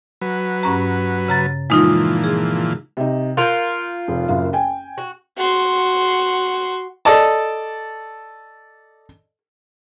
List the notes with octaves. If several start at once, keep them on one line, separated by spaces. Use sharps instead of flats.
F#3 B4
G2 C#4 A#5
C#3 A#5 A6
A#2 E3 F3 G#3 D#4 F4
G#4
C3 D#4
F4 A#4 F#6 G6
F1
F#1 F#2 F5
G5 G#5
F#4
F#4 C6
A4 D5 D#5 A5